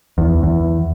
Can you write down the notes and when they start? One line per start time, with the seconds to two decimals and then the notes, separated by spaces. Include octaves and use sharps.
0.18 E2
0.43 E2